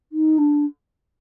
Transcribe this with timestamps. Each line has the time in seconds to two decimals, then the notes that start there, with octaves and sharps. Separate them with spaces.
0.12 D#4
0.38 D4